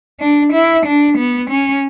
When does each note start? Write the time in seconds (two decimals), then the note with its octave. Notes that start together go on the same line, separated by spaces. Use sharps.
0.20 D4
0.53 E4
0.86 D4
1.18 B3
1.50 C#4